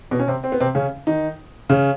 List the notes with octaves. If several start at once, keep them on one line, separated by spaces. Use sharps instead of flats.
B2 B3
C#4
C3 C4
C4
B3
C3 C4
C#3 C#4
D#3 D#4
C#3 C#4